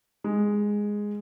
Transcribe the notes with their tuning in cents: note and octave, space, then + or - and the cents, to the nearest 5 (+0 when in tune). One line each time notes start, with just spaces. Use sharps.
G#3 -5